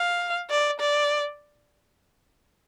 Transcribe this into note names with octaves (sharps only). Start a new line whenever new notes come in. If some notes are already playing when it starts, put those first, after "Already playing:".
Already playing: F5
D5
D5